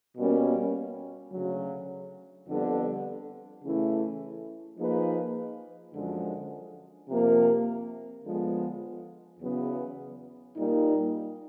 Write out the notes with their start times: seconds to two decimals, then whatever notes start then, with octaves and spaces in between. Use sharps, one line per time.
0.17 B2 G3 A#3 C#4
1.32 D2 C#3 F#3
2.47 F2 D3 G3 B3 D4
3.63 C#3 E3 A3 C#4 E4
4.78 F3 A#3 D#4 G#4 B4
5.93 F#2 D3 F3 G#3
7.09 C3 F3 A#3
8.24 D3 F3 G#3 B3
9.40 E2 C#3 F#3 B3
10.56 A#2 G3 A#3 D#4